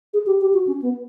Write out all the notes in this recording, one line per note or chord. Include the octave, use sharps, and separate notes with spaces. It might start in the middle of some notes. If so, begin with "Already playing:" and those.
G#4
G4
G4
F#4
C#4
B3